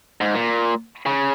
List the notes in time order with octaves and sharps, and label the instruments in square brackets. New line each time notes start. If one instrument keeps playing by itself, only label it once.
[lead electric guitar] G#2
A#2
C#3